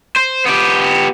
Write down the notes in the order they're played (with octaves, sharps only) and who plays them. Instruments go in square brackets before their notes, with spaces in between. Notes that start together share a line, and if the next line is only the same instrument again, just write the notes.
[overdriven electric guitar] C5
B3 G4